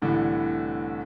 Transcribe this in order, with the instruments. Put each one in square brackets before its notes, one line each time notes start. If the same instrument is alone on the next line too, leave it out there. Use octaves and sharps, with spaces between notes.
[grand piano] C2 A2 D3 E3